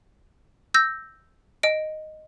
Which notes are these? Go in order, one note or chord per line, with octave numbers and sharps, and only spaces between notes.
E6 G6 A#6
D#5 D7